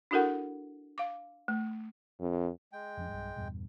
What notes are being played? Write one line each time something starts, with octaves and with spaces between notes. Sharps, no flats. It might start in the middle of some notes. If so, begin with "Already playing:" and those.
D4 E4 F#4 A4 A#4 F#5
F5 D6
A3
F2
G#3 G5
F2 F3 C#4
B1 G2
E2 G2 A#2